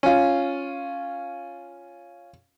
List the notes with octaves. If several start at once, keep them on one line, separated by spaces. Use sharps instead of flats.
C#4 F4